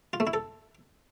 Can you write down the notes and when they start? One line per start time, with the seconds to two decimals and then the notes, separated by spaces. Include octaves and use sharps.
0.13 F4
0.20 A3
0.27 E4
0.33 A4